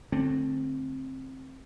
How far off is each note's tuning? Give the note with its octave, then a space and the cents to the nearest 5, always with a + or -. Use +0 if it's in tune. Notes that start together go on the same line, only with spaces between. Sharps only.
D3 +0 A3 +0 C4 +15